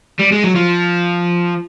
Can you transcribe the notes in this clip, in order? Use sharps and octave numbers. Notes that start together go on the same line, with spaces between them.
G3
G#3
F#3
F3